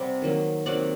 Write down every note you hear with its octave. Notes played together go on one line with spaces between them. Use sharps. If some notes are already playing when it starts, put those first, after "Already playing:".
Already playing: C3 G3 D5 F#5
D#3 F#3 A#3
C3 D#3 F#3 A#3 D5 F#5